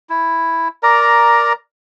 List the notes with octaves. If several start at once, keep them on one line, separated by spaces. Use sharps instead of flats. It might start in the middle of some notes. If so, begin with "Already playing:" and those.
E4
A#4 D5 A#5